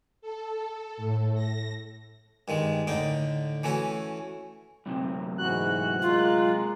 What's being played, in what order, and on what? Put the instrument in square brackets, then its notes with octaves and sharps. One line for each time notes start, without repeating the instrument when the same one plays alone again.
[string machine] A4
A2
A#6
[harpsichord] G2 D#3 G#3
A2 D3 D#4 G5
E3 A3 C#4 F#4
[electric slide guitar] F#2 C3
[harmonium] G#2 E3 F#4 [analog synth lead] F#6
[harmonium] G#3 A#3 [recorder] F4